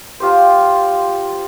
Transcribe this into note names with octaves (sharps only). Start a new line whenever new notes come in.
F4 G4 C5